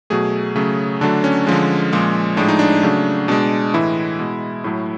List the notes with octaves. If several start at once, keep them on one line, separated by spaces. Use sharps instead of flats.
B2 F#3 A3 G#4
C#3 F#3 A3
D3 F#3 A3 D4
C#4
D3 F3 G#3
A#2 F3 G#3
A2 F3 G#3 D4
D#4
D4
C#3 F#3 A3
B2 G#3 D4
A2 E3 G#3 E4
B2 G#3
A2 F#3 A3 E4